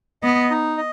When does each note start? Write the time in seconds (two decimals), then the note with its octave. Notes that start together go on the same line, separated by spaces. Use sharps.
0.23 B3 D#5
0.50 D#4
0.77 D#5